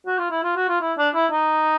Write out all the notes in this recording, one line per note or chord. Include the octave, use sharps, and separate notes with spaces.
F#4
F4
E4
F4
F#4
F4
E4
D4
E4
D#4